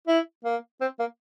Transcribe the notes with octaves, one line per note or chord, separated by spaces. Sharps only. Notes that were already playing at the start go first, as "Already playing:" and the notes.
E4
A#3
C4
A#3